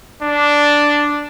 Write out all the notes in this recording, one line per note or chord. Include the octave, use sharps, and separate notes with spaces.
D4